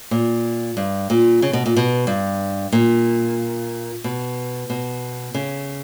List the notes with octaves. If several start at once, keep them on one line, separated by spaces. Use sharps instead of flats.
A#2
G2
A#2
C#3
B2
A#2
B2
G2
A#2
B2
B2
C#3